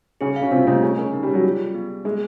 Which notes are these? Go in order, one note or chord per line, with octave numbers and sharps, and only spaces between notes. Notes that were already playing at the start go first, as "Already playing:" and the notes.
C#3 C#4 G#4
F5
C#3 C#4
C3 C4 F4
C3 A3 C4
C#3 C#4 G4
C#3 C#4 A#4
D#4
G3
C#5
F#3
G3 F4
G#4
B3
B3
G#3 A#3